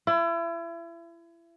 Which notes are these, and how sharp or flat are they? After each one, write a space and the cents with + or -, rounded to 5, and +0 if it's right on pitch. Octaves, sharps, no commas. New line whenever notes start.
E4 +35